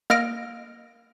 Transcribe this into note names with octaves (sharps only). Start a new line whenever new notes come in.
A#3 D#5 F6 A#6 D7